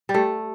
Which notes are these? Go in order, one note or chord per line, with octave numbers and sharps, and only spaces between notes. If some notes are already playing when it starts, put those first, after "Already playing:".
G3
A3 G4